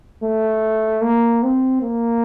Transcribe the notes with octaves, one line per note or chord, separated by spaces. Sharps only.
A3
A#3
C4
A#3